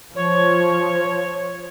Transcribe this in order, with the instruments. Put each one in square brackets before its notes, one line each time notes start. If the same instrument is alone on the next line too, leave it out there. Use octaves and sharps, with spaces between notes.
[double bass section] F3 [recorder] C#5